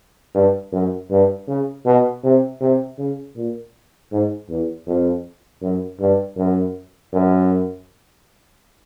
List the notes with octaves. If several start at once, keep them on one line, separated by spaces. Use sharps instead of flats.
G2
F#2
G2
C#3
B2
C3
C3
C#3
A#2
G#2
E2
F2
F#2
G2
F#2
F#2